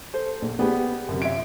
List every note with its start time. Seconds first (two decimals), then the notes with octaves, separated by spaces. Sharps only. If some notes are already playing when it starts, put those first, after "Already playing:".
0.14 A4 C5
0.42 A#1
0.59 B3 G4 G#4 D5
1.08 F#2 C3
1.22 F4 C#5 E5 D7